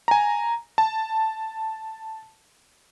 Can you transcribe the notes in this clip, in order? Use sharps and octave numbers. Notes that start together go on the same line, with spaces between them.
G#5 A#5
A5